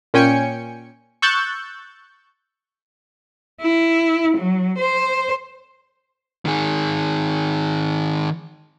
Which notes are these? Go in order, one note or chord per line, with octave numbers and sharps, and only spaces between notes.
A#2 C#4 G5 G#5 C#7
C#6 E6 F#6 G6 A6
E4
F#3
C5
D#3 G#4